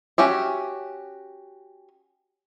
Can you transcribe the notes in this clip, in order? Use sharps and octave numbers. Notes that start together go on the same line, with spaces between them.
C#4 F#4 G4 E5